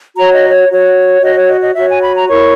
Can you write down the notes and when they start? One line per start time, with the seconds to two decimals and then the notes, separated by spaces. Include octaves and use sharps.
0.15 F#4 C#5 A#5
0.33 D#5
0.51 C#5
0.69 F#4 C#5
1.21 F#4 C#5 D#5
1.35 C#5
1.48 D#5
1.61 D#5
1.75 F#4 C#5 E5
1.89 G#5
2.01 B5
2.15 A#5
2.28 E4 A#4 C#5 C#6